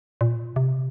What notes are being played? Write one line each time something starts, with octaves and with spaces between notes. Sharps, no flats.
A#2
C3